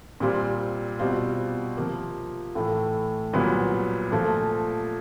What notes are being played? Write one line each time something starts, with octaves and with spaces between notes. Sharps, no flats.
A#2 G3 C4 F4
B2 G3 C4 F4
C3 F3 A#3
A2 E3 A3
C2 A#2 F#3 B3
A#2 F3 A3